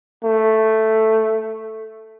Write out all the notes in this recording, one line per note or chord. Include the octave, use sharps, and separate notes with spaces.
A3